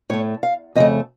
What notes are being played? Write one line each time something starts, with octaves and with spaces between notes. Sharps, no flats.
A2 A3 C#5
F5
F2 C#3 A3 D#5